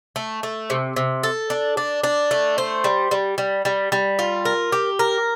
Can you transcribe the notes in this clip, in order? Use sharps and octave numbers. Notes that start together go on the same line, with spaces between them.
A3
A3
C3
C3
A4
D4
D4
D4
A3
C5
G3
G3
G3
G3
G3
F4
A#4
G4
A#4